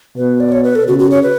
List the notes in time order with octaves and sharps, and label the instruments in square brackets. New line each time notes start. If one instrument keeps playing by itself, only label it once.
[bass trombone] B2 [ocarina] B4
[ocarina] D5
C#5
B4
A4
[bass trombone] C#3 [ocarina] F#4
[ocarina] F#4
C#5
B4